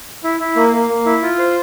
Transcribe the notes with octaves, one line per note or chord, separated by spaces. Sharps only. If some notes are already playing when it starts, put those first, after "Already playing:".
E4
E4
A#3
A#3
A#3
E4
F4
C5